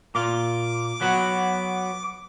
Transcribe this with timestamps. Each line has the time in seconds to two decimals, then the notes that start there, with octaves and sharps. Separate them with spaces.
0.15 A#2 F4 D6
1.01 F#3 B3 F#4